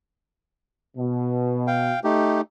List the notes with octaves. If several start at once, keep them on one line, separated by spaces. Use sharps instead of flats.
B2
F5 G5
A3 D#4 G4